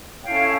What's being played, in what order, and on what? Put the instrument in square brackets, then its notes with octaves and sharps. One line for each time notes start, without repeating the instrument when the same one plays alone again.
[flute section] C#4 E4 A4 C#5 F5 G5